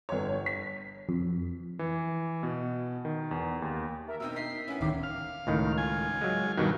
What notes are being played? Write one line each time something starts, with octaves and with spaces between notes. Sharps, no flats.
G1 C#5
B6
F2
E3
B2
D#3
E2
D#2
A#4 E5
B2 C4 D#4 E6
D#4 B6 C7
B3 C#4 E4
D1 D#3 E5 D6
F5
C#2 A2 D#3
F4 G#5
F#3 G#3
G2 B2 D#3 F#3 G3 F4